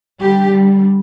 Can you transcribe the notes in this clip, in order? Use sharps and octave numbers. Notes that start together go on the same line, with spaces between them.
D3 G3 G4
D3 G3